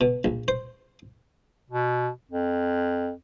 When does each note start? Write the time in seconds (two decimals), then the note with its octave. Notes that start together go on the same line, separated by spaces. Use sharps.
0.01 B2
0.25 A#1
0.48 C5
1.70 B2
2.31 F2